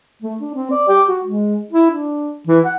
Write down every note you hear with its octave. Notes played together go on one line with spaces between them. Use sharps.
A3
D4
C4
D5
G4
F#4
G#3
E4
D4
E3
F#5